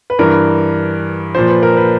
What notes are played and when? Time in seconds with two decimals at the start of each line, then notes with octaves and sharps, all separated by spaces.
0.10 B4
0.19 G2 E3 A#4
1.35 A#2 F3 C5
1.49 B4
1.63 A#4
1.77 B4